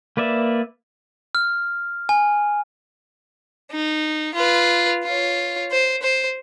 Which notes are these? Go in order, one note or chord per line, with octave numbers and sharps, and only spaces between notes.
A#3 B4 D5 E5
F6
G#5
D#4
F4 B4
F4 C#5
C5
C5